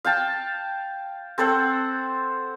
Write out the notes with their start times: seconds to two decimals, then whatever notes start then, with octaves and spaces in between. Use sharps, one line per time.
0.05 F5 G5 A5
1.38 C4 A4 C5 F#5